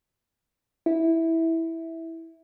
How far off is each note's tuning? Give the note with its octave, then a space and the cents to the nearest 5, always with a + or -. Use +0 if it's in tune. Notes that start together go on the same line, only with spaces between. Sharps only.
E4 -10